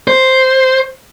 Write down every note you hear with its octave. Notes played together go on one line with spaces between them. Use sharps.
C5